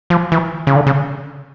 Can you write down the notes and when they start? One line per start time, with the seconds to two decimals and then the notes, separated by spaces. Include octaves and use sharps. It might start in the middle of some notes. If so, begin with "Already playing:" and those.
0.10 F3
0.32 E3
0.67 C#3
0.76 D3
0.87 C#3